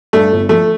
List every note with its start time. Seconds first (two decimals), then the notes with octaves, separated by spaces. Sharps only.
0.13 G2 A3
0.32 G1
0.49 F3 A3